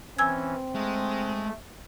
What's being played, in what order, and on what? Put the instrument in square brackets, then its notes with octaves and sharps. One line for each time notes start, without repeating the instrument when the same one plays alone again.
[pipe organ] E3 C#4 [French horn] C4 [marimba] G#5 E6 G#6
[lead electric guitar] G#3 [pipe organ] A3